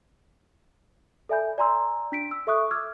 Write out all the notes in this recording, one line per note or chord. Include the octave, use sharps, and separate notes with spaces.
A4 D5 E5 G#5 B5 G6
D5 G#5 A#5 C6 E6
D4 B6 D7
E6
A4 E5 C#6 D#6 F#6
D6 E6 F6 G#6